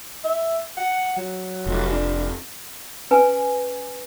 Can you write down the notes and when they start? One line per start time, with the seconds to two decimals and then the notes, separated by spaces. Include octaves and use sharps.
0.24 E5
0.78 F#5
1.17 F#3
1.66 F1
1.91 D4
3.11 C#4 B4 G#5